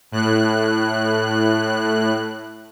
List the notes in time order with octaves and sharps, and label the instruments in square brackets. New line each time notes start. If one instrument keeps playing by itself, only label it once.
[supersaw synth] A2 F#6